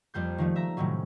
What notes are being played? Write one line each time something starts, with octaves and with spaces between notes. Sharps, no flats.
F2 G3 A#3 G6
D#3 F3 A3
E5 A#5
A2 C3 D#3 F#3 C#4